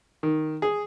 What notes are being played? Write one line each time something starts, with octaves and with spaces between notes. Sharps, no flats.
D#3
G#4